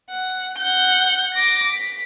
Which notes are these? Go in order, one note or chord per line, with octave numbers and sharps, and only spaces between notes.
F#5
F#5 G6
D6 A#6
B6